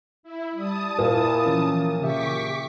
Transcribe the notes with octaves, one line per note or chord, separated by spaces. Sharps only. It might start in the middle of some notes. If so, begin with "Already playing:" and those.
E4
G3 A5 D#6
A#2 A#3 E4
E3 F3 C#4
C#3 G4 E5 C#6 D6 B6